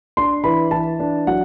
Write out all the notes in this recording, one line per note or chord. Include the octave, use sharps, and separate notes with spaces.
D4 C6
E3 B5
E3 A5
D4
F#3 F#5